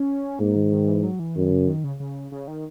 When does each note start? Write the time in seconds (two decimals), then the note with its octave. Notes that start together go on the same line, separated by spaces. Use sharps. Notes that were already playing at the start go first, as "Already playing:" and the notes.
Already playing: C#4
0.39 G#2 A#3
0.56 D#3
0.72 D#3
0.88 E3
1.03 F#3
1.19 E3
1.36 F#2 D#3
1.51 C#3
1.68 D#3
1.84 C#3
2.00 C#3
2.32 C#3
2.47 D#3